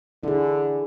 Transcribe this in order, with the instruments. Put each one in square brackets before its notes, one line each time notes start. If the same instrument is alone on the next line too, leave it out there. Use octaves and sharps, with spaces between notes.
[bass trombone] D3 [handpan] E4 G#4